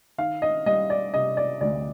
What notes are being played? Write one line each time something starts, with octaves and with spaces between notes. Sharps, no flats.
D#3 F5
D#5
G3 D#5
D5
C3 D#5
D5
D2 D5